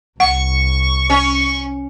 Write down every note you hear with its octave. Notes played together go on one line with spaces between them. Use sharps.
C2 F#5 C#6
C#4